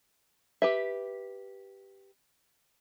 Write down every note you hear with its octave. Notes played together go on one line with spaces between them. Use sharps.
G4 B4 E5